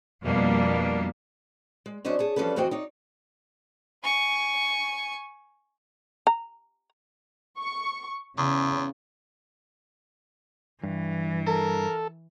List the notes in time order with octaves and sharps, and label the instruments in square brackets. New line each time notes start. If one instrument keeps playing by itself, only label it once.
[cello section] F2 B2 G3 A#3 B3 D4
[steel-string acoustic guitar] G#3
F#3 C#4 D4 C5 C#5 D#5
G#4 C#5 A5
E3 F3 G3 C#4 A4 B4
F2 E3 F#4 C5 D#5 G5
D#4 C#5 D5
[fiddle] G#5 C#6
[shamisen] A#5
[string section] C#6
[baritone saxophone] E2 [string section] C#3
[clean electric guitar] G2 [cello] E3
[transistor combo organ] A4 [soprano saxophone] A#4